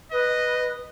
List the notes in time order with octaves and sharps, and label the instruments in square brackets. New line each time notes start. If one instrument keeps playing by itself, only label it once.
[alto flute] B4 [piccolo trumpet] D#5